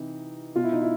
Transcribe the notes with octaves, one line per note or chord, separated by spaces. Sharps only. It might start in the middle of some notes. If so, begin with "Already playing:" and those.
Already playing: C3 E3 D#4
B2 F4
E4
D#4
E4